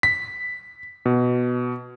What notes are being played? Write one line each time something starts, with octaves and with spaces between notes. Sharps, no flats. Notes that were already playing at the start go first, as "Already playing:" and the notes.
B6
B2